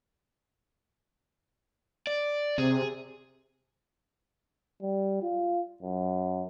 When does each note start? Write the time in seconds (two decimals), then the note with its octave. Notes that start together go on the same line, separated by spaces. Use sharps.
2.07 D5
2.58 C3 G#4
4.82 G3
5.23 F4
5.82 F#2